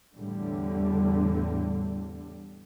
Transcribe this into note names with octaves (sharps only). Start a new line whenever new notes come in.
E2 A2 D3 G3